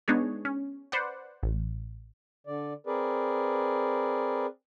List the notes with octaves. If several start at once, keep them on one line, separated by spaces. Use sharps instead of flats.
G#3 B3 D4 D#4 G#4 C#5
C#4
B4 C5 D5 F#5
A1
D3 D5
C4 G#4 A#4 B4 D5